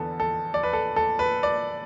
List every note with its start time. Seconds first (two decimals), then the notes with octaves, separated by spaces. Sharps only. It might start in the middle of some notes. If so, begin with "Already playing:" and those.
Already playing: E2 D3 B3 A4
0.20 A4
0.54 D5
0.63 B4
0.73 A4
0.96 A4
1.19 B4
1.43 D5